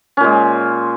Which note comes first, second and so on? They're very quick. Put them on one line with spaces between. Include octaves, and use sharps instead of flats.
C#4 A#2 G#3